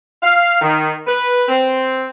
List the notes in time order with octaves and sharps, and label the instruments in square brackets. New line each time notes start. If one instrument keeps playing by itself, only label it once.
[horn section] F5
D#3
B4
C4